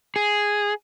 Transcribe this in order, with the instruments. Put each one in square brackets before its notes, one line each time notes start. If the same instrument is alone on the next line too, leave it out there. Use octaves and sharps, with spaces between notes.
[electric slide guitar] G#4